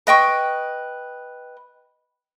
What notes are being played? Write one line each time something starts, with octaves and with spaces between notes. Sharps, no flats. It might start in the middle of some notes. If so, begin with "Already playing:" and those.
B4 D#5 G5 C#6